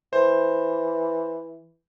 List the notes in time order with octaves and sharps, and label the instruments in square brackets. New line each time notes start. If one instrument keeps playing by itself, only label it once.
[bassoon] E3 [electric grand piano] C5